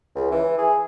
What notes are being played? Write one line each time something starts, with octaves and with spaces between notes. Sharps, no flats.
C#2
E3
G#4